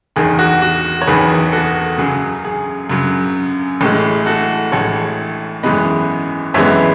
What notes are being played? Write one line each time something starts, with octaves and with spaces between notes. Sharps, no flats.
F#1 E2 D#3 G#4
F#4
F#4
C#5
F#1 E2 D#3 G#4 B4
F#4 A4
F#2 C#3 F#3 G#4
G#4
F#2 C#3 F#3
A1 A2 G#3
F#4 A4
A1 A2 G#3 A4 C#5
G#1 F#2 E3 G#3 B3 B4 D#5
G#1 F#2 E3 G#3 B3 C#5 E5